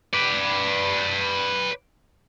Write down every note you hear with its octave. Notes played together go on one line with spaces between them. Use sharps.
B4 D5